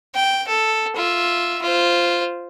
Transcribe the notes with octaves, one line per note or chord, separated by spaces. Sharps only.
G5
A4
F4 E5
F4 C5